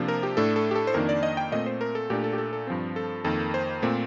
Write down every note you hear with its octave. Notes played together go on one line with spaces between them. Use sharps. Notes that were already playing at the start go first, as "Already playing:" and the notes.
Already playing: C3 F3 A#3 D4
A#4
G4
A2 A3 D4 A4
A4
G4
A4
C5
F2 D#3 A#3 D4 A#4
D5
D#5
G5
A#2 A3 C4 D#5
C5
A#4
A4
A#2 A3 D4 G4
A4
G4
A4
A4
G2 F3 C4
A4
F2 D#3 A#3 A4
C5
A#2 A3 C4